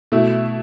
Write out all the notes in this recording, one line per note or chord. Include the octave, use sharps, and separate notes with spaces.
B2 A3 E4